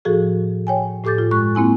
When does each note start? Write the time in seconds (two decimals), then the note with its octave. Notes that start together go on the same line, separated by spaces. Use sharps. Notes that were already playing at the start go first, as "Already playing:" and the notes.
0.05 A2 F3 F#4 G#4 A4
0.67 C#5 G5 G#5
1.04 A2 G4 A4 D6 G6 A6
1.18 F4
1.31 G2 G#3 C#6 F#6
1.55 A#3 C4 E4 G#5